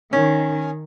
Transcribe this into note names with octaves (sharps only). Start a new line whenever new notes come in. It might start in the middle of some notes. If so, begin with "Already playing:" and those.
D#3 C#4